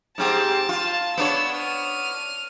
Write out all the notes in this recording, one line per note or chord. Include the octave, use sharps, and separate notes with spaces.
G#2 C4 G4 A5
F4
B3 D4 C#5 E6
F6 D#7